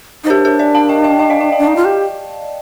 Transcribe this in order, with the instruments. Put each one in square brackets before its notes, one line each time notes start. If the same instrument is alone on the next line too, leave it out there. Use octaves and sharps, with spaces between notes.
[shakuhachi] D#4
[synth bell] C5
[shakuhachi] D4 [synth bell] G4 A#4
[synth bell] G4 A#4
A#4 D5
F5 A5
D#5 G5
D#5 G5
D#5 G5
D5 F5
D#5 G5
F5 A5
[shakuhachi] D4
[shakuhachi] D#4 [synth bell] D#5 G5
[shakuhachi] F4
[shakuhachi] G4 [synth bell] G5